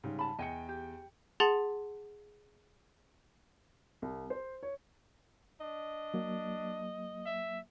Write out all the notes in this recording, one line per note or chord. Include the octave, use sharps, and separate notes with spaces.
G#2 C#3 G3
A5 B5
E2 D#5 G5 G#5 C#7
G4
G#4 F#5 A5 C6 A6 F#7
C2
C5
C#5
D4 D#5
F#3 A#3
E5